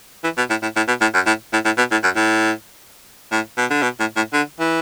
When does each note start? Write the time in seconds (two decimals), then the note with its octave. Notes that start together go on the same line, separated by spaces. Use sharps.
0.24 E3
0.38 B2
0.50 A2
0.63 A2
0.76 A2
0.88 B2
1.01 A2
1.14 F#2
1.27 A2
1.53 A2
1.65 A2
1.77 B2
1.91 A2
2.03 F#2
2.16 A2
3.32 A2
3.58 B2
3.71 D3
3.83 B2
4.00 A2
4.16 A2
4.33 D3
4.60 E3